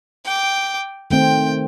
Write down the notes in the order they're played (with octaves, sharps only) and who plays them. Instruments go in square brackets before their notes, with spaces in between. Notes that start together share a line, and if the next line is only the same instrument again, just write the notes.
[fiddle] G5 D6
[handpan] D#3 A3 C4 [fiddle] G5